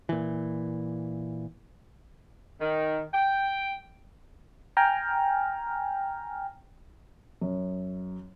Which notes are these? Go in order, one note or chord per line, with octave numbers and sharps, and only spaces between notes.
A#2 E3
D#3
G5
G5 G#5 A#5 F6
F#2